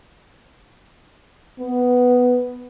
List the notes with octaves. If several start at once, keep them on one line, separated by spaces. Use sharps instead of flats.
B3